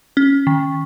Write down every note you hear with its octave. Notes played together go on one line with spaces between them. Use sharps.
C#4
D#3